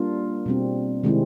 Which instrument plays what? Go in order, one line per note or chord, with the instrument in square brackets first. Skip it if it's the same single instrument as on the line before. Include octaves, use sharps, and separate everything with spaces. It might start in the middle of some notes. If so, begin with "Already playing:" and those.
Already playing: [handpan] G3 A#3 D4 F4
B2 G3 C4
C3 D#3 G#3 C4 E4